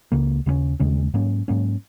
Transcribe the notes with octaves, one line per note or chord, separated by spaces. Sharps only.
C#2 C#3 A#3
D#2 C#3 G#3 C#4
D#2 C#3 G#3 C#4
G#2 F#3 A#3 C#4
G#2 F#3 A#3 C#4